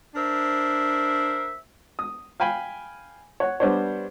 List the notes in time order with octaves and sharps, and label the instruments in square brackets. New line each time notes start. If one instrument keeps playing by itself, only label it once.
[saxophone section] D4 A#4 C5 E5
[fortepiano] D#6
F5 G5 G#5 B5
C#5 F#5
G3 B3 D4 C5 C#5